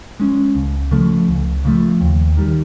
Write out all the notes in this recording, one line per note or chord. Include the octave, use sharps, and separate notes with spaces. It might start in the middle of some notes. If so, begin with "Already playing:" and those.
G#3 C#4
C#2
C#3 F3 A3
C#2
C#3 F3 A3
D#2
D#3 G3